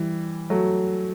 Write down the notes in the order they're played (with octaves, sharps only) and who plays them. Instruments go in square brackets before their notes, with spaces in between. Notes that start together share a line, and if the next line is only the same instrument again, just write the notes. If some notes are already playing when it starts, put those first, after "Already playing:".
Already playing: [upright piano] E3 G3
F#3 A3